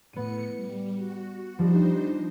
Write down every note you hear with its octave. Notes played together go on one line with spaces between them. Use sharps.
A2 B3 C#7 D#7
G3
F#4
F3 G3 D4 D#4 C5